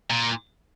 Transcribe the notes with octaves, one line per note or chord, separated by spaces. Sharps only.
A#2